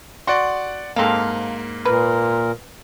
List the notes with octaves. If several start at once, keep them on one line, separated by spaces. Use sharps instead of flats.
F#4 D5 F#5 C6
G#2 A#3 C4 A4 F5
A#2 A#4 B4